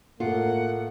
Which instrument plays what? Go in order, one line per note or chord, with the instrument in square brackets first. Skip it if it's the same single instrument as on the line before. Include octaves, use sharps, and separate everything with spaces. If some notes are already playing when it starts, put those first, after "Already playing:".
[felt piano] A2 A3 [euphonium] A#3 [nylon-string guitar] F4 [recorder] F#5